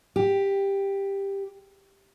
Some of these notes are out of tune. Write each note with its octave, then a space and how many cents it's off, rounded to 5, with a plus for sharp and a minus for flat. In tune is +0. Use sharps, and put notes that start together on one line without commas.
G4 +10